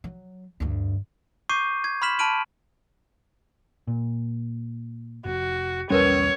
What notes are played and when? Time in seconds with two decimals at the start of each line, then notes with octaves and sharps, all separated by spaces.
0.04 F#3
0.60 D2 G2
1.49 C#6 D6 G6 C7 D#7
1.84 G#6
2.02 B5 C6 F6 B6 E7 F#7
2.19 A5 B5 F6 D7 D#7 F#7
3.87 A#2
5.25 F1 F#4
5.90 B1 E2 G3 C#4 A#4 B4 C#5